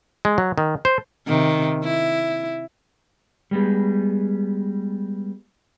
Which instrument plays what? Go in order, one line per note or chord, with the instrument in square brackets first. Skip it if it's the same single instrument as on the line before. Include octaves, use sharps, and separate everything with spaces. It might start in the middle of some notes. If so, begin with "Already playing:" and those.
[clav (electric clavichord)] G#3
F#3
D#3
C5
[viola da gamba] C3 D#3
E4
[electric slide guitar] G3 G#3 B3